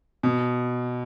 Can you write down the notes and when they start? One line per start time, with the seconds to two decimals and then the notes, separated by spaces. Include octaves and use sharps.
0.23 B2